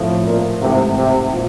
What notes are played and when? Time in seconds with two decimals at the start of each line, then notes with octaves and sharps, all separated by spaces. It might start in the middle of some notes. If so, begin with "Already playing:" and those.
Already playing: A2 F3 A3 C4 F4
0.25 A#2
0.61 G#2 C3 E3 A3
0.97 C3
1.34 A#2